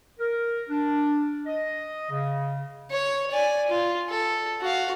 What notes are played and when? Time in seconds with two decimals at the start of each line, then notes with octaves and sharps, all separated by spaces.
0.19 A#4
0.69 D4
1.46 D#5
2.10 C#3
2.91 C#5
3.31 D5 G#5
3.69 F4
4.09 A4
4.61 F#4 F5